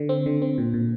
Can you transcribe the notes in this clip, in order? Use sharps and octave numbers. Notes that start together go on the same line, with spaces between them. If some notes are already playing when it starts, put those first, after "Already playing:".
Already playing: D3
C4
D3
C4
A#2
A#2